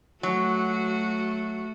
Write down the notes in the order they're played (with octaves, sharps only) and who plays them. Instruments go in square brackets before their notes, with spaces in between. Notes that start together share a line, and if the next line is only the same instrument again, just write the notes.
[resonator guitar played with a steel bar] F#3 [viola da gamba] A3 F#4